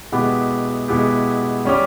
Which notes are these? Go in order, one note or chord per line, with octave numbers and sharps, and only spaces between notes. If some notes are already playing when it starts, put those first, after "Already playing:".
B2 G#3 B3 E4 G4
B2 G#3 B3 E4 G4
G3 C#4 G4